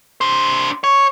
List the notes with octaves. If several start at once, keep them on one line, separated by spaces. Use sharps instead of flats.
D4 C5
C#5